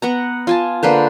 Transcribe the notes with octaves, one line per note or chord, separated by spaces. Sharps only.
B3 F#5 A#5
F4 G#5 A5
D3 A#3 B4 C5